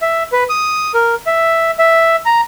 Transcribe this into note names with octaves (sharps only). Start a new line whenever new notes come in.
E5
B4
D#6
A#4
E5
E5
A#5